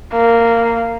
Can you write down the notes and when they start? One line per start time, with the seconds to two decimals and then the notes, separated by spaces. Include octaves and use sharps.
0.13 A#3